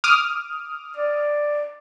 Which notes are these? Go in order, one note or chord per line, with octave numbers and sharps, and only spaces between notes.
D6 D#6 F6
D5